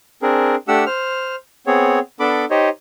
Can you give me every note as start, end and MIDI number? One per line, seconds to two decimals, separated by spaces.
0.22 0.55 60
0.22 0.55 62
0.22 0.55 68
0.22 0.55 70
0.68 0.84 57
0.68 0.84 62
0.68 0.84 67
0.68 0.84 78
0.68 0.84 88
0.86 1.35 72
0.86 1.35 89
1.67 1.99 59
1.67 1.99 60
1.67 1.99 68
1.67 1.99 73
2.20 2.45 59
2.20 2.45 62
2.20 2.45 69
2.20 2.45 83
2.20 2.45 86
2.50 2.69 63
2.50 2.69 67
2.50 2.69 72
2.50 2.69 73
2.50 2.69 75